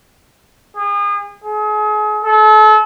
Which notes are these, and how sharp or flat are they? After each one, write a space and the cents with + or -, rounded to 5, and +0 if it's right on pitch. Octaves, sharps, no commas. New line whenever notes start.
G#4 -35
G#4 +35
A4 -35